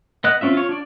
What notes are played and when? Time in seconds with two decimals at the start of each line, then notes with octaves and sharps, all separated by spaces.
0.24 B3 D#5 F#6
0.41 C4 C#4 F4 E5
0.53 F4 C#5
0.69 D4 D5